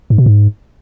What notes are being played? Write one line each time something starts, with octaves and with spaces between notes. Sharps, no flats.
G#2
B2
G#2